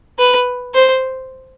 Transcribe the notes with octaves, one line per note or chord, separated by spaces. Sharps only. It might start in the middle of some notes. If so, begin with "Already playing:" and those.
B4
C5